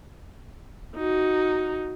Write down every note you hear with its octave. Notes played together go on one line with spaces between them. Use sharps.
D#4 F#4